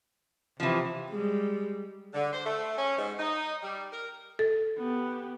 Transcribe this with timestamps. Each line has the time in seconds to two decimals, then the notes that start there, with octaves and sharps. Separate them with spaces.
0.60 C3 E3 F3
1.11 G3 G#3
2.13 D3
2.33 C5
2.45 A3
2.78 C#4
2.98 G#2
3.19 D#4
3.63 G3
3.92 A#4
4.39 A4
4.78 B3 G4